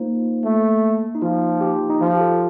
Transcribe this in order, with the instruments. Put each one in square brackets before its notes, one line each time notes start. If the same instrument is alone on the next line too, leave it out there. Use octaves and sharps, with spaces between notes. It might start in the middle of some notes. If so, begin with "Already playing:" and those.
Already playing: [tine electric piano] A#3 D#4 F4 C5
[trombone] A3
[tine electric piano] D#4
[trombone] F3 [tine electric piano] F4
[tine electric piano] G4
D#4
[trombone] F3 [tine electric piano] F4
[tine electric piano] G4
A4